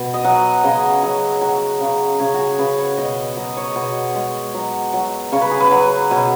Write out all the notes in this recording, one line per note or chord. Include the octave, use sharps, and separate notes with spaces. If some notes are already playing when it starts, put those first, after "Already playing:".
Already playing: B2
D#5
F#3 F#5
C#3 D#5
F#3
F#3
C#3
C#3 C#5
F#4 G#4
C#3 B4
C#5
B2 D#5
F#3 D#5
C#5
B2
G#3
F#3
F#3
C#3 C#5
B4
G#4
B4
F#3
B2